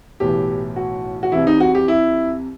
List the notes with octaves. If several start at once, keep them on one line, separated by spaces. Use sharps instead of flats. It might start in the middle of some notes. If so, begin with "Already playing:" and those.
B1 A2 E3 G4
F#4
F#4
C2 C3 E3 E4
D#4
F#4
G4
E4